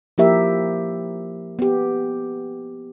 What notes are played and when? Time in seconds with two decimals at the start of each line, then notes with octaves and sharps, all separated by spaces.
0.18 F3 A#3 E4 G4 A#4 E5
1.59 B3 G4